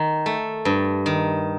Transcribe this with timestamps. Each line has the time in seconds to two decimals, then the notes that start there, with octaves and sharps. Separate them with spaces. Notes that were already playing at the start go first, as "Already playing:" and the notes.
Already playing: D#3
0.26 A3
0.65 G2
1.06 D#3